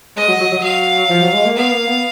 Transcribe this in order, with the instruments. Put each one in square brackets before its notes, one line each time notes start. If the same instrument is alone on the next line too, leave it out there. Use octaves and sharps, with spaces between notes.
[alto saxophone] G#3 [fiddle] D#5
[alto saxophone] F#3
F#3
F#3
[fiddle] F5
[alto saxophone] F3
F#3
G#3
A#3
[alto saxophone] B3 [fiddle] F5
[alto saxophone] A#3
B3